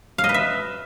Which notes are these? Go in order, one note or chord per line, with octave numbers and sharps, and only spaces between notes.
F5
D#5
B4
E5